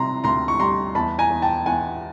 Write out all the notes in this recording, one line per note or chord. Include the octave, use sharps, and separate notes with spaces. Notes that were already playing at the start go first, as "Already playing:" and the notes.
Already playing: C3 G3 A#5 C6
D2 A#5 C6
C#6
G3 A#5 C6
E2 A5 B5
G#5 A#5
E2
G5 A5
E2 F#5 G#5